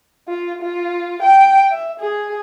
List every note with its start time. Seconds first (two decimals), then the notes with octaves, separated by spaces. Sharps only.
0.28 F4
0.62 F4
1.22 G5
1.71 E5
2.00 G#4